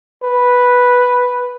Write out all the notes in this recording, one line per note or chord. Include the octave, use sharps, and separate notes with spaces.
B4